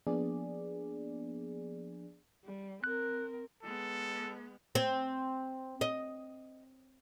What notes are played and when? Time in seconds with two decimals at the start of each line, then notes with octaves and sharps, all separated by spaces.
0.07 F3 A#3 B3 D4 G#4 D5
2.45 G3
2.84 C4 A#4 F#6
3.63 G#3 B3 A4
4.75 C4
5.81 D#5